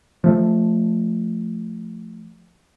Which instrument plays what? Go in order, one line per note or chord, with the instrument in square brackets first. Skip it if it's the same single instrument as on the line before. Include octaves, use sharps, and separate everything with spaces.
[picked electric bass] F3 A3